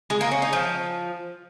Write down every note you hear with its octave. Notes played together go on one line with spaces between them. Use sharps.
G#3
A#3
C#4
D#4
F3